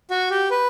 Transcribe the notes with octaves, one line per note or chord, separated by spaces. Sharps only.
F#4
G4
B4